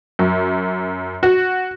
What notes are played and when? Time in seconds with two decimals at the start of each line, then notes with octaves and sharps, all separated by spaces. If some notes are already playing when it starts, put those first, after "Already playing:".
0.19 F#2
1.23 F#4